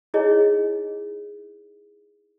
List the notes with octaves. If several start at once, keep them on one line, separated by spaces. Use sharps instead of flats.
D#4 E4 G#4 C#5 D#5